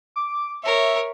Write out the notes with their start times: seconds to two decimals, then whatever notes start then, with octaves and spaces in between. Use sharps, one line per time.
0.16 D6
0.64 A#4 C#5 E5